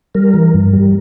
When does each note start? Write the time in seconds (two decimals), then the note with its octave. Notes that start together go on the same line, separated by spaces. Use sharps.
0.15 G3 A#4
0.34 E3
0.54 G2
0.73 G3